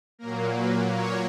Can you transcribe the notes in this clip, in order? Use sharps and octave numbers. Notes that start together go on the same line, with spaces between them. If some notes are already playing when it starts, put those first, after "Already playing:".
A#2 F#3 A#3 A#4
B4
C#5